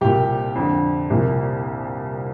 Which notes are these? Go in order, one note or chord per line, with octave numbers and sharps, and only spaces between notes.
C2 A#2 G4
F2 D3
C2 A#2